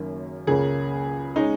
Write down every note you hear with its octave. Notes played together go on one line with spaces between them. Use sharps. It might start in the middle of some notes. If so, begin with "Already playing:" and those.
Already playing: F#1 F#2 D#3 A#3 C#4
C#2 C#3 A#3 C#4 G#4
G#3 C#4 D#4